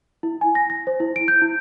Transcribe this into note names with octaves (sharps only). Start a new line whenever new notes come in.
E4
G#5
A#6
A#6
C5
E4
D7
G6
E4